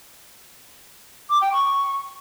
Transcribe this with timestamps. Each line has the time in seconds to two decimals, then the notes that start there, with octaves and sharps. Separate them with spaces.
1.30 D6
1.41 G5
1.53 C#6